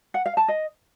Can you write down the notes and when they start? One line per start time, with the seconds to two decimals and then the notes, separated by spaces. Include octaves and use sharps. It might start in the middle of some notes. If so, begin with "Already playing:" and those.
0.14 F#5
0.26 F5
0.37 A5
0.48 D#5